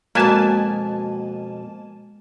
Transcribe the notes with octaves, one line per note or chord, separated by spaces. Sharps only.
F2 B2 G#3 A#3 F#4 B4 G#5 A5